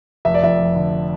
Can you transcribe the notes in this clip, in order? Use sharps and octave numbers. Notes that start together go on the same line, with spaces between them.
F1 E5
D5
F2 E5
F1
D3